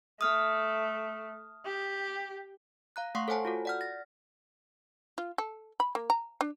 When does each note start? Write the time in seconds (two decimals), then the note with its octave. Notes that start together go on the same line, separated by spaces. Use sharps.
0.21 A3 D#6 F6
1.66 G4
2.96 F5 A#5 F#6
3.15 A3 F5 F#5 C6 C#6 C7
3.28 A4 C5 C#5 F#5 G#5 A5
3.45 F4 F#4 A4
3.65 D5 F#5 F6
3.81 A6 A#6
5.18 F4
5.38 A4
5.80 B5
5.95 A#3
6.10 A#5
6.41 D4